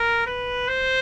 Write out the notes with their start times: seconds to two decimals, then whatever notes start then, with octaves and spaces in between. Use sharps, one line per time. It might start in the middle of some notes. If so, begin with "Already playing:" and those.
Already playing: A#4
0.27 B4
0.68 C5